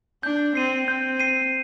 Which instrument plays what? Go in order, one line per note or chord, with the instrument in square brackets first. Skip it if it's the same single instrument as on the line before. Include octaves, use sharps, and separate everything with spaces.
[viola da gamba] D4 [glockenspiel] G6
[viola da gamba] C4 [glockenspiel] C7 D#7
[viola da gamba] C4 [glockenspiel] G6
[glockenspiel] C7 D#7